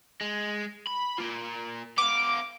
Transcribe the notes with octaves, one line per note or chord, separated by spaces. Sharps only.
G#3
B5
A#3 F4
B3 F5 D6